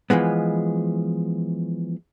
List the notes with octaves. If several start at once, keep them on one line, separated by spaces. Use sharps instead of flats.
E3 F3 G#3 B3